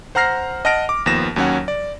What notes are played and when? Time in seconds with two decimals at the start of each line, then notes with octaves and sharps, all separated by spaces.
0.15 C5 F#5 A#5 F6 A#6 C7
0.65 D#5 F#5 A5 F6 A#6 D7
0.89 D6
1.06 D#2 F3 B3 A#6 E7
1.36 D#2 F#3 C#4 C#5 F#5
1.68 D5